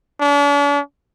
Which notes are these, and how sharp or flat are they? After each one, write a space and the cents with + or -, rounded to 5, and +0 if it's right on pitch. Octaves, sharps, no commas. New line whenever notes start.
D4 -45